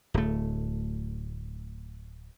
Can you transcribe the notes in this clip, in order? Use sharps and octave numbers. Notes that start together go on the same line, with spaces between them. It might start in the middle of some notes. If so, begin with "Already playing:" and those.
D1 A3